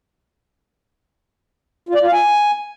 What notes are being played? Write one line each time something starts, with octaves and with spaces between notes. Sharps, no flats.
F4
D5
F4
F5
G#5